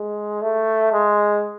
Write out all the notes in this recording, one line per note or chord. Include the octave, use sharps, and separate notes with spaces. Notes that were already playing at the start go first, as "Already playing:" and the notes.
Already playing: G#3
A3
G#3